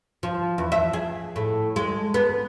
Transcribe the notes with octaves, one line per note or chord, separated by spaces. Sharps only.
F3
E2
E5
G#4
A2
G#3
B3